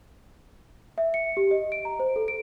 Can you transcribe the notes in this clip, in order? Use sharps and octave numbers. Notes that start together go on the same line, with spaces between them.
E5
C#7
G4
D#5
D7
A#5
C5
A4
D7